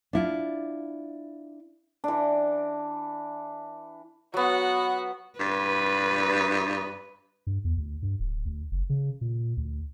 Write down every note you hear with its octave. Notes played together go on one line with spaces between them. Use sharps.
D4 E4 F4
E3 D4
F#3 B3 F#4 F#5
G2 B4
G2
E2
D2
G2
D1
D2
F#1
C#3
A#2
D2